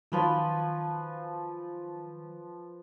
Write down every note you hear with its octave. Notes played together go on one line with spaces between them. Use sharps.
D#3 F3 F#3 B4 G#5